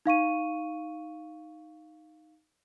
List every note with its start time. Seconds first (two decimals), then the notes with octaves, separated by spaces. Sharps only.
0.06 D#4 F5 C#6 D#7